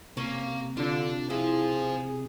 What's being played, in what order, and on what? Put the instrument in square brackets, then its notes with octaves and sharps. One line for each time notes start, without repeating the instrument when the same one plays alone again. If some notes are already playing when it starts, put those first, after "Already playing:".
[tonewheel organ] C3 [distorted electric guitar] A#3 [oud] C#4
[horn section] D3 [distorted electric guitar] D4 [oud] F4
[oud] E4 [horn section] G#4 [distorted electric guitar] C5 F5